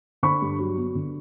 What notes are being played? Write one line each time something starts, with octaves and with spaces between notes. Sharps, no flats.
D3 B5 C#6
G2
F#3
B3
D3